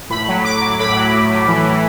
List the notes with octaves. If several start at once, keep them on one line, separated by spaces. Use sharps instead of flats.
A2 B5
F#3
F#3 D6
F#3
A2 B5
F#3
A2
A2
E3
E3